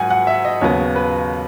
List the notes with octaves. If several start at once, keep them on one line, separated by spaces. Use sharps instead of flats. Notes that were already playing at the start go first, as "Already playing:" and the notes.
Already playing: G#2 F#3 F#5 G#5
F#5
E5
D#5
D#2 C#3 F#3 B3 C#5
B4